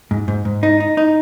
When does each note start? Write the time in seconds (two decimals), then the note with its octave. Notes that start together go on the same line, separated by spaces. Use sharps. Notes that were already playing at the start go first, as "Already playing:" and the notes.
0.11 G#2
0.28 G#2
0.45 G#2
0.63 D#4
0.80 D#4
0.97 D#4